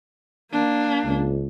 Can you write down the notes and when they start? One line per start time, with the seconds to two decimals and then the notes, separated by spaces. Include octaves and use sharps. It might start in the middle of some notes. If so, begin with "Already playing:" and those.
0.52 A#3 D4
1.04 C#2